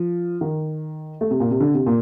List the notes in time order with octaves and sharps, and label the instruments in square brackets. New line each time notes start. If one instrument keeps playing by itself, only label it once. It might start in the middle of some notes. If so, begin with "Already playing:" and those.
Already playing: [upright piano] F3
D#3
A3
C3
A#2
C3
D3
C3
A#2